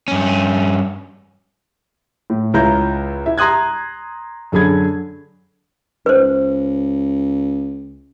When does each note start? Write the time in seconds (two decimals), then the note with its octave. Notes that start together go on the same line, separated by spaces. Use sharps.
0.08 G2 C#4
2.30 A2
2.54 C#2 E4 F4 C#5 A#5 G6
3.26 E4 E5
3.38 A#5 C6 D#6 F#6 G#6
4.52 F#2 D3 F#3 G#4 B5 G#6
6.06 C#2 B4 C5